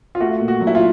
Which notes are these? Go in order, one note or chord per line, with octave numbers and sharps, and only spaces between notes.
F4
A3 F#4
A#2
F#4
F#3
E4
F4